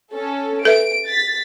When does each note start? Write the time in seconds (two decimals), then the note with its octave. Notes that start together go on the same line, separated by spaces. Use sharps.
0.13 C#4 A4
0.65 A4 B4 E5 D7
1.07 A6 B6